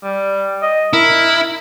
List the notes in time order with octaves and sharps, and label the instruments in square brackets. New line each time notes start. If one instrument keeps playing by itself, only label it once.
[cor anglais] G3
D#5
[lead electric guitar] E4 [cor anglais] A#4